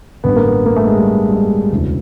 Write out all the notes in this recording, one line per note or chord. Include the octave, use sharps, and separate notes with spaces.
A1 G2 D3 B3
A#3
B3
A#3
A3
G#3
G3
G3
G#3
E1 D2 C#3 E3